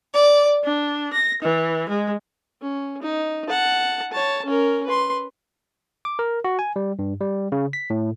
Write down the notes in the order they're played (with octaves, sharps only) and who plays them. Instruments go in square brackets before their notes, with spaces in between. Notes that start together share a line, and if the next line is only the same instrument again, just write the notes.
[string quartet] D5
D4
A#6
E3
G#3
[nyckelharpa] C#4
D#4
F#5 A5
C#5 A5
C#4 A#4
B4 C6
[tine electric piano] D6
A#4
F#4
G#5
G3
G2
G3
C#3
B6
A2